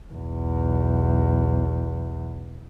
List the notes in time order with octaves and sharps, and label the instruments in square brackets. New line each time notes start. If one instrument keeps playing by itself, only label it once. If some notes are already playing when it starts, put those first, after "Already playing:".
[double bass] B1 E2